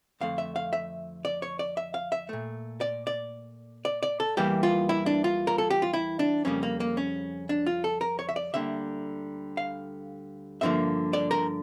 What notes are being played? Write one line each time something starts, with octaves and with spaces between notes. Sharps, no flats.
F2 D3 A3 F5
E5
F5
E5
D5
C#5
D5
E5
F5
E5
A#2 A3
D5
D5
D5
D5
A4
E2 E3 G3 A#3 G4
F4
E4
D4
F4
A#4
A4
G4
F4
E4
D4
F2 C#3 G3 A#3 C#4
A#3
A#3
C#4
D4
F4
A4
A#4
C#5
E5
D5
D2 D3 G3 A#3 E5
F5
G2 D3 F3 A#3 E5
D5
A#4